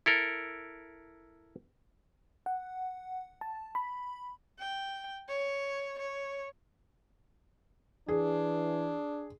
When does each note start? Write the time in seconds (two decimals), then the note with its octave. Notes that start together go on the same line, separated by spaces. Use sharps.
0.06 E4 A4 A#4
2.46 F#5
3.41 A5
3.75 B5
4.59 G5
5.28 C#5
5.99 C#5
8.08 E3 D4 G#4